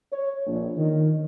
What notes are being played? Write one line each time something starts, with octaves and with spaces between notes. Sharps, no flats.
C#5
A#1
D#3